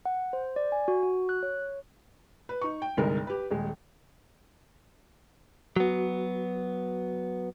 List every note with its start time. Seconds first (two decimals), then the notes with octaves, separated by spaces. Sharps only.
0.06 F#5
0.33 C5
0.56 D5
0.72 G#5
0.88 F#4
1.03 F#4
1.29 F#6
1.43 C#5
2.49 B4
2.62 D#4 C#6
2.82 G5
2.97 G1 C2 G#3 D#4 A#4
3.27 G4 B4
3.51 D#1 G#3
5.76 F#3 B3 F#4